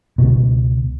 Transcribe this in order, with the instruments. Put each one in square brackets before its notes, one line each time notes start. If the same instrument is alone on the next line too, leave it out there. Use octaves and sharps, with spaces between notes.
[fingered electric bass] C#2 B2